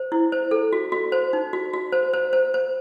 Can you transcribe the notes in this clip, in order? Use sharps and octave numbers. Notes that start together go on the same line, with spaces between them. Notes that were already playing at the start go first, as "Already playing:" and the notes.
Already playing: C5
E4
C5
A4
F#4
F#4
C5
D#4
F#4
F#4
C5
C5
C5
C5